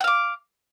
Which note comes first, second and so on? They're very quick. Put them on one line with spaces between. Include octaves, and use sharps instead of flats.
F#5 F5 D6